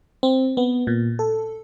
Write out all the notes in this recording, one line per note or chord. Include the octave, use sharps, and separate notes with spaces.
C4
B3
A#2
A4